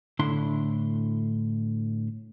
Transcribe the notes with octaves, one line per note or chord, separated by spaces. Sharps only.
A2 D3 D4 E4 C6